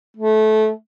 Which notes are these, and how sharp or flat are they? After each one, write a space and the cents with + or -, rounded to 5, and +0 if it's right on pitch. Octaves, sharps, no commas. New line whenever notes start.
A3 -20